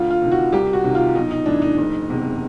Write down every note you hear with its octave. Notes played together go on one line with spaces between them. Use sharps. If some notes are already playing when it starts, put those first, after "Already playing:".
Already playing: D2 F4
F4
C3 D#3
F#4
C2 G4
F#4
C3 D#3
F4
B1 D#4
D#4
A2 E3 D4
D#4
F#1
E2 C3